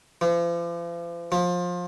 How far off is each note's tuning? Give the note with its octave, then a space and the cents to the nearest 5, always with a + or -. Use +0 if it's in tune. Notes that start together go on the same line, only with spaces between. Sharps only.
F3 -40
F3 +25